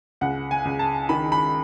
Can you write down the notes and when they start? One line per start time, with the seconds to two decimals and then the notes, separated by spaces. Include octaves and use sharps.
0.21 C#2 F#5
0.51 G#5
0.65 C#2
0.79 A5
1.09 D#3 B5
1.32 B5